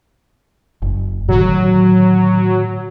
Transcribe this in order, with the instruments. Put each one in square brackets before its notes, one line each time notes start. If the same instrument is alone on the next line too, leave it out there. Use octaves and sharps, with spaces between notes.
[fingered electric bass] F#1
[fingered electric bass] A2 D3 D#3 [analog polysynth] F#3